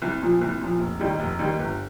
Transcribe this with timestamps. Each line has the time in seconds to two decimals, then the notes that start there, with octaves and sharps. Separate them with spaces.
0.02 C2
0.22 A#2 F3
0.41 C2
0.61 A#2 F3
0.80 F1
1.00 D#2 D#3 G3
1.20 F1
1.39 D#2 D#3 G3
1.59 G1